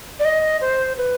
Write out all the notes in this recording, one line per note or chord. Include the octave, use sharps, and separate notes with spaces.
D5
D#5
C5
B4